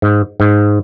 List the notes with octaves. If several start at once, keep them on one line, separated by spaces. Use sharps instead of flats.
G#2
G#2